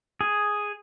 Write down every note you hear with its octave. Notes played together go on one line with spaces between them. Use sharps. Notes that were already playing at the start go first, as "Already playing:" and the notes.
G#4